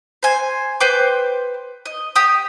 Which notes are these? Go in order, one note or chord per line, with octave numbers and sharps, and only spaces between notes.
C5 G#5
B4 C5 G5 D6
D#5
G4 G5 D#6